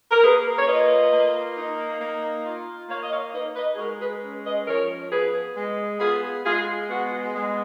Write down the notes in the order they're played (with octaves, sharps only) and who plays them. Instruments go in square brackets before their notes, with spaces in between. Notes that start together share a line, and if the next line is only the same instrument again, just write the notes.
[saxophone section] A#4
A#3 G#4 B4
C#5
F4 B4 D#5
A#3
D#4
A#3
F4
A#3 C#5 F5
D#5
C#5 F5
D#4 B4 D#5
B4 D#5
G#4
G#3 F#4 A#4
G#4 B4
C#4
B4 D#5
F3 A#4 C#5
B3 G#4 B4
G#3
B3 F4 G#4
G#3 F4 G#4
B3 F#4
G#3